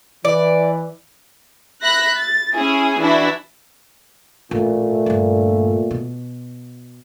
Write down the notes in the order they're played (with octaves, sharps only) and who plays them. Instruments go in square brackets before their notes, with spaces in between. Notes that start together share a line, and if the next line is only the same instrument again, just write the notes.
[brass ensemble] E3 [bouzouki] D5
[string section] E5 B5 F#6 A#6
A6
C#4 E4 G#4
E3 D4 E4 F#4
[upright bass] A1 [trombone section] A#2 A3
[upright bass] G2 D3
B2